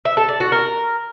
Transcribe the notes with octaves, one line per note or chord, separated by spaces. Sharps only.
E5
A4
D5
F#4
A#4